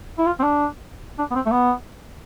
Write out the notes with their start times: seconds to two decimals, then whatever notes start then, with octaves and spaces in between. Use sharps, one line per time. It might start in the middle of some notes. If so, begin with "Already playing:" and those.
0.18 E4
0.26 F4
0.39 C4
0.43 D4
1.19 D4
1.31 B3
1.35 C4
1.46 A3
1.52 B3